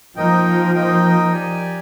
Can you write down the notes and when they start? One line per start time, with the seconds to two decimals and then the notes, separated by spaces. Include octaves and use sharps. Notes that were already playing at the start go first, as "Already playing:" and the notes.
0.16 F3 A#3 D#4 A#4 D#5 G5
0.75 A#3 D#4 A#4 D#5 G5
1.33 G4 D5 G#5